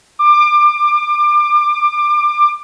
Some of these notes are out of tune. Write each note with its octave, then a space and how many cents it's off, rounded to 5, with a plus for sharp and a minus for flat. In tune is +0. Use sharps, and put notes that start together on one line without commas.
D6 +25